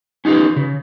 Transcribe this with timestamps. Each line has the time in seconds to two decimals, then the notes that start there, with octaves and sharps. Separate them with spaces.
0.25 C#4 D#4 F4 G4 B4
0.56 C#3